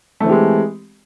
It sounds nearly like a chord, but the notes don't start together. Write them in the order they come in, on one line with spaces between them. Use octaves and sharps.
A3 E3 C4 G4 G#3